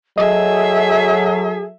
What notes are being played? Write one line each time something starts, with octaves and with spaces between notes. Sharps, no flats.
F#3 G#4 A4 D#5 E5